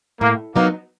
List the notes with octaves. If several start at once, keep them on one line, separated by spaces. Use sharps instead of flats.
A2 A#3
F#3 A#3 B3 D#4